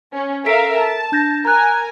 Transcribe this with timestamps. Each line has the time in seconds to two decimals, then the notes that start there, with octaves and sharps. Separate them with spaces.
0.13 C#4
0.46 A4 A#4 E5 F5 B6 D7
0.79 A5
1.12 D4 G6 A#6
1.45 A#4 G#5 A#5 F#6